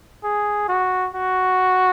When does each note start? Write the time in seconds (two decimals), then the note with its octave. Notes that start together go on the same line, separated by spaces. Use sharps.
0.24 G#4
0.68 F#4
1.15 F#4